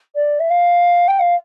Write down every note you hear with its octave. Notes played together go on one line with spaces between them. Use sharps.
D5
E5
F5
G5
F5